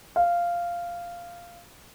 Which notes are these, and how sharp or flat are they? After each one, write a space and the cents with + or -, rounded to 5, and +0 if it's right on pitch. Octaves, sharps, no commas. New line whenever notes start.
F5 -10